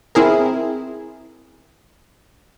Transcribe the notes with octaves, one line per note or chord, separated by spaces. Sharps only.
C4 E4 G#4 A#4